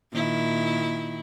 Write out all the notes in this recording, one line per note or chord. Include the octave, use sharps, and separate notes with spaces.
A#2 D#3 E4